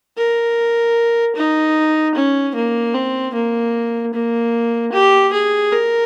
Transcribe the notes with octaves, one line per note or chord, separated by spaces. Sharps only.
A#4
D#4
C#4
A#3
C4
A#3
A#3
G4
G#4
A#4